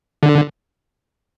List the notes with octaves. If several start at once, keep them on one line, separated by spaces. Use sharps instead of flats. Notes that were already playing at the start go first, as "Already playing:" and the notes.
D3